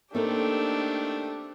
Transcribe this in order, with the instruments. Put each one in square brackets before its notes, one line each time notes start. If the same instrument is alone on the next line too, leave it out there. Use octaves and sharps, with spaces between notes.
[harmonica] D#3 A3 [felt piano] A#3 [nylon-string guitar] C4 A4 A#4 [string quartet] D4 G4